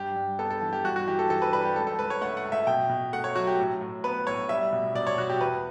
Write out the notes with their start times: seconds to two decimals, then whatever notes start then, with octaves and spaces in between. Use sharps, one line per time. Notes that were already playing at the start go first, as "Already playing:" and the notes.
Already playing: G2 G4
0.16 G2
0.39 B3 A4
0.50 A4
0.62 E3
0.73 G4
0.84 G2 F#4
0.96 F#4
1.07 E3 G4
1.19 A4
1.30 E3 A4
1.42 B4
1.53 G3 B4
1.65 G4
1.76 C#2 A4
1.87 A4
1.98 C#2 B4
2.10 C#5
2.21 A3 F#5
2.37 F#5
2.44 C#2
2.52 E5
2.67 B2 G5
2.89 B2
3.13 A3 F#5
3.24 C#5
3.36 F#3 F#4
3.47 G4
3.59 A2
3.81 A2
4.04 B3 B4
4.27 A2 C#5
4.49 G3 E5
4.72 B2
4.95 B2 D5
5.07 C#5
5.18 B2 F#4
5.30 G4
5.41 E2 B4